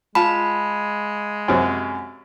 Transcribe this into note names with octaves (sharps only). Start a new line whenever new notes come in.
G#3 F4 A5 B5
F#2 C3 F#3